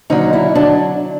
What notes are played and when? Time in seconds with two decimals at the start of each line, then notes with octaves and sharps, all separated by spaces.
0.10 D#2 D3 F#3 C#4 D#4
0.33 D4 E4
0.55 D3 F#3 D4